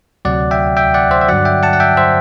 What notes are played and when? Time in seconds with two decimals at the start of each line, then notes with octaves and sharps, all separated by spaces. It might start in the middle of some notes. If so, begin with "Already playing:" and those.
0.25 D2 C3 F#3 D5 F#5
0.51 E5 G5
0.77 E5 G5
0.94 D5 F#5
1.11 C5 E5
1.21 E5
1.28 G2 D3 F#3 D5 F#5
1.45 E5 G5
1.63 F#5 A5
1.73 F#5
1.80 E5 G5
1.97 C5 E5